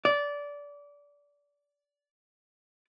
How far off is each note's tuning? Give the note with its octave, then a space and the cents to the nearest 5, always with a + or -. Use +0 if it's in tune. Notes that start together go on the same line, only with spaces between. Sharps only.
D5 -20